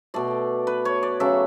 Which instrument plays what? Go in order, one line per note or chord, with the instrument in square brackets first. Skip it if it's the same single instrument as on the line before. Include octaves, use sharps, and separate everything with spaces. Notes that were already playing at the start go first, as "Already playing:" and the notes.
[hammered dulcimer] B2 A3 D5
B4
C#5
D5
C#3 F#3 A3 E5